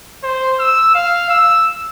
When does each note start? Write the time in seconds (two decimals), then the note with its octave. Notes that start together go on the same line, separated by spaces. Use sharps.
0.24 C5
0.59 E6
0.95 F5
1.30 E6